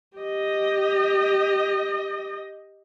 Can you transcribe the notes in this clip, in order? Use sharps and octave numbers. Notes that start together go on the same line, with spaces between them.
G4 D#5